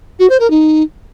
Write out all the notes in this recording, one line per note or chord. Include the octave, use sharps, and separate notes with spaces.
F#4
C5
A#4
D#4